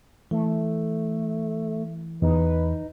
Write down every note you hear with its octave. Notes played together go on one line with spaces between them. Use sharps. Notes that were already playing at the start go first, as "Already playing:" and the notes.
E3 A3
E2 D#4 B4